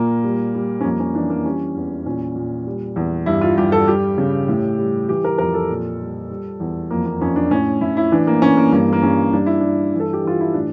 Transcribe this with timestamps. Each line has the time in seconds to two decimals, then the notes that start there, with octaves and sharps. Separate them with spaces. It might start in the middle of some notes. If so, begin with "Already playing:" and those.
Already playing: A#2 A#3
0.24 G3
0.54 G3
0.81 C#4
0.84 F2 A#3
1.00 C#4
1.15 E3 D4
1.30 A#3
1.45 G3 C#4
1.76 E2
2.05 A#2 C#4
2.36 A#2
2.67 G3
2.96 E2
3.26 G2 E4
3.41 F4
3.58 G2 G4
3.72 A4
3.87 G3 G4
4.18 C#3
4.48 A2
4.79 G3
5.08 E3 G4
5.24 A#4
5.38 F2 A#4
5.54 A4
5.70 A#2
6.00 G3
6.30 G3
6.60 E2
6.91 F2 A#3
7.06 A#3
7.21 F2 C#4
7.36 D4
7.51 A2 C#4
7.81 A2 E4
7.97 E4
8.12 E3 D4
8.27 A#3
8.42 E3 C#4
8.57 A#3
8.72 G2 A#3
8.93 A#3
9.02 G2 C#4
9.33 G2 D4
9.46 E4
9.61 G2 D4
9.94 E3
10.00 A4
10.13 G4
10.24 E3 F4
10.41 E4
10.54 A2 D4